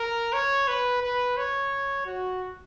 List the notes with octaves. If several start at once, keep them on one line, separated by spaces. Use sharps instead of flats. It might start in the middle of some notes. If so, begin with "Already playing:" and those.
Already playing: A#4
C#5
B4
B4
C#5
F#4